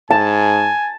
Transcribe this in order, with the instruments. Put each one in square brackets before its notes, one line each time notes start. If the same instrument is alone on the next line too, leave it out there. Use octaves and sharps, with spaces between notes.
[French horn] G#2 [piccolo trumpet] G#5 [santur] A5